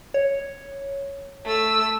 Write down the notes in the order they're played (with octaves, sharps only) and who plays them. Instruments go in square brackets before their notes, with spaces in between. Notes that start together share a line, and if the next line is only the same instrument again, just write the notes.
[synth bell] C#5
[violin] A3 E6